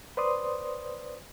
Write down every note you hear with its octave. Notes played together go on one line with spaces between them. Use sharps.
B4 C5 D5 C6 D#6